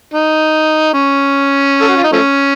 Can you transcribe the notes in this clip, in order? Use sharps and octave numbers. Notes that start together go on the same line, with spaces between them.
D#4
C#4
A4
F#4
F4
D#4
F3 A3 C#4